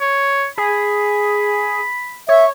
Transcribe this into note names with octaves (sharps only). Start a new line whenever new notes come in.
C#5
G#4 B5
C#5 E5